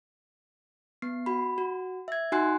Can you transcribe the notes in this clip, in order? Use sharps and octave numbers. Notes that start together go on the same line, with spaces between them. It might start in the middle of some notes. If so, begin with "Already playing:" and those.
B3 C7
F#4 B5
F#4
E5 G#6
D#4 F#4 G#5 C6 F#6 C7